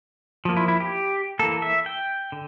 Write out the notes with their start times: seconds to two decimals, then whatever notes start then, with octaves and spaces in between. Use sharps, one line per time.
0.45 F3 A#3
0.57 E4
0.68 E4
0.80 G4
1.39 E3 A#3 A4
1.62 E5
1.86 G5
2.32 D3